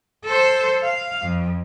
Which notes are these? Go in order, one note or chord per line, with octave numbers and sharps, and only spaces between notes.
A4 C5
F5
F2